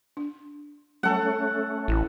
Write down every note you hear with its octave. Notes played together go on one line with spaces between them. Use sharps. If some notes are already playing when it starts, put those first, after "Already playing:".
D4
F#3 G3 A3 C#4 A4 F#5 G#5
A1 E4